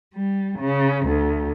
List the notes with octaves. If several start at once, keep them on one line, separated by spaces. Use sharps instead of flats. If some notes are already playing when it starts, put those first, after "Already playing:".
G3
C#3
D2